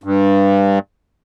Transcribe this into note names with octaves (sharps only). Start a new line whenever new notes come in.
G2